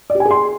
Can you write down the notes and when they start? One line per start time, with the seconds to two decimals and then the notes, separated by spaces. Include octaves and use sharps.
0.10 D5
0.15 G4
0.20 G#5
0.25 G#4
0.31 C6